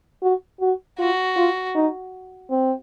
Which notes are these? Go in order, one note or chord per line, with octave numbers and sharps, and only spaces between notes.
F#4
F#4
F4 F#4
F4
D#4
C4